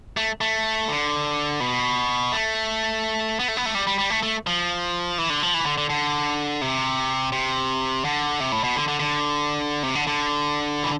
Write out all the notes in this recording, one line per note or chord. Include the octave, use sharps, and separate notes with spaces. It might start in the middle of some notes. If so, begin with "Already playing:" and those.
A3
A3
D3
B2
A3
B3
A3
B3
A3
G3
G3
G3
A3
A3
F3
E3
D3
F3
E3
D3
D3
D3
C3
C3
D3
C3
A2
B2
D3
D3
D3
C3
D3
D3
E3